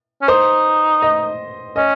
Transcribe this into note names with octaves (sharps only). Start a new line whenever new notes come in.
C#4
D#4 C5
D#5
C#4 D#5